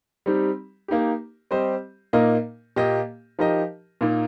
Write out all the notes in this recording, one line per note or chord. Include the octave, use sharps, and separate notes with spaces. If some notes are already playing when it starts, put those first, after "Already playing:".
G3 C4 D#4 G4
A#3 D#4 G4
G3 C4 G4 C5 D#5
A#2 A#3 D#4 A#4 D#5
A#2 A#3 G4 D#5
F3 D#4 G4 A#4 D#5
A#2 A#3 D#4